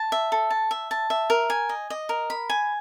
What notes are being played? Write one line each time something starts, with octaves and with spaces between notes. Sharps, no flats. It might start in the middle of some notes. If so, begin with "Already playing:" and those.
Already playing: A5
E5
A4
A5
E5
A5
E5
A#4
G#5
D#5
D#5
A#4
B5
G#5